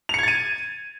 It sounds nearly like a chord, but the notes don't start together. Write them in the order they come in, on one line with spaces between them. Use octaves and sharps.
F7 C#7 G#6 A6 D#7